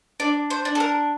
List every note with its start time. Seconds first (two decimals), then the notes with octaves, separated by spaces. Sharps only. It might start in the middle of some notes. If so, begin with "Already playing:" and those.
0.20 D4 D5
0.50 C5
0.65 D4
0.75 A4
0.80 A#4